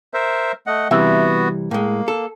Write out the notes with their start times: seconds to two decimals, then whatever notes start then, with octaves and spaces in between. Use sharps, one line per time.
0.14 A#4 C5 E5
0.67 A3 D#5 F#5
0.91 C3 E3 G3 B3 F#4 E5
1.71 A2 G#3 A#3
2.08 A4